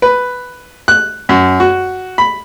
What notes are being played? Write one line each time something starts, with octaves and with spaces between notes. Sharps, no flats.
B4
F#6
F#2
F#4
B5